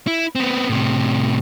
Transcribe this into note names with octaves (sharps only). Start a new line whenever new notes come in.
E4
B3 C4
A2 C3